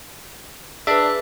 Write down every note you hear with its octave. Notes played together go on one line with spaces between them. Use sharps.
D4 G#4 B4 E5